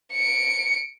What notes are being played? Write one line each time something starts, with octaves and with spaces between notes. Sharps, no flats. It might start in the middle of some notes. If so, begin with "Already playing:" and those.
C#7 D7